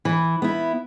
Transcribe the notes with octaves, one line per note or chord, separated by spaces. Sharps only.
E3
B3 E4